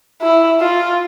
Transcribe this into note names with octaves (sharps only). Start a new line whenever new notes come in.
E4
F4